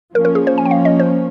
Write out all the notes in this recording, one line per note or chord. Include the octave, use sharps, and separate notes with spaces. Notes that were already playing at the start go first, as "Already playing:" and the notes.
F3 A#3 C#4 A#4
A#4
G#4
C5
G#5
G5
F5
D#5
C5